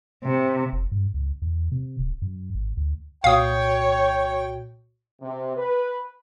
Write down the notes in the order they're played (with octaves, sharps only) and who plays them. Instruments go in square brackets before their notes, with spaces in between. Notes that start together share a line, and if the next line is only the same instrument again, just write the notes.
[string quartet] C3
[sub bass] F1
G2
C#2
E2
C3
D1
F#2
G#1
D2
[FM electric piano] C2 A#2 F#4 [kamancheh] C#5 [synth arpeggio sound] F5 D#6 [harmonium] G5
[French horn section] C3
B4